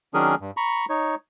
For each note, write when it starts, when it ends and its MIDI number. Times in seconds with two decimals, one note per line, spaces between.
0.14 0.35 51
0.14 0.35 54
0.14 0.35 61
0.14 0.35 62
0.14 0.35 68
0.14 0.35 70
0.41 0.51 43
0.57 0.85 82
0.57 0.85 83
0.57 0.85 85
0.90 1.15 63
0.90 1.15 73